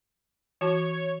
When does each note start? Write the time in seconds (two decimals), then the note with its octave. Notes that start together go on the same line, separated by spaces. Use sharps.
0.61 E3 F#4 C#5 A5